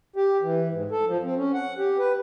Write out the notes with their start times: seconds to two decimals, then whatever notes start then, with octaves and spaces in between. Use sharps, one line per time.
0.16 G4
0.42 E3
0.71 G#2
0.91 A4
1.07 F3
1.23 C4
1.36 C#4
1.54 F#5
1.78 G4
1.98 B4